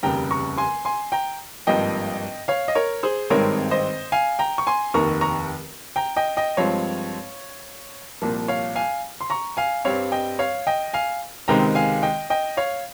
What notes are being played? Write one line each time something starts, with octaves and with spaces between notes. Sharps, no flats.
F1 D#2 C#3 G3 G5 A#5
A#5 C#6
G#5 C6
G#5 C6
G5 A#5
G#1 G2 F3 A#3 D#5 G5
C#5 F5
D#5
A#4 C#5
G#4 C5
G#1 G2 D#3 G#3 C4 A#4 C#5
C5 D#5
F5 G#5
G5 A#5
C#6
G#5 C6
F1 D#2 D#3 A#3 A#5 C#6
A#5 C#6
G5 A#5
D#5 G5
D#5 G5
G2 F3 G#3 C4 C#5 F5
C2 A#2 F3 A#3
C#5 F5
F5 G#5
C6
A#5 C#6
F5 G#5
G2 G3 C4 C#5 F5
D#5 G5
C#5 F5
D#5 G5
F5 G#5
C#2 C3 D#3 G#3 C4 G5 A#5
F5 G#5
D#5 G5
D#5 G5
C#5 F5